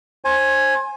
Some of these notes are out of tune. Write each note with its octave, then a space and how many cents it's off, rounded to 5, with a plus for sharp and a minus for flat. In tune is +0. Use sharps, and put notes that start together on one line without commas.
C5 +35 G#5 +0